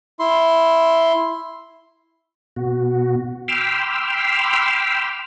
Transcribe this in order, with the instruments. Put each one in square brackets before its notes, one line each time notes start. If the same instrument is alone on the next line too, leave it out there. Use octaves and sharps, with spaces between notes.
[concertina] E4 C6
[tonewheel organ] B2 F#4
G5 B5 C6 D6 E6 F6